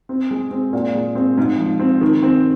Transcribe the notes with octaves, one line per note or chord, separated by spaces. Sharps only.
C4
G#3
C4
A#2
G#3
C4
G#2
F3
C4
D#3
C4